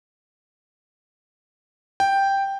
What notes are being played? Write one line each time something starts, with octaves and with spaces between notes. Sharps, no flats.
G5